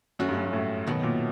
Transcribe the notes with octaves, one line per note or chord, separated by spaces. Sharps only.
F#2 A3 C#4 F#4
G2
F#2
G2
A2
B2 D#3 F#3 B3
A#2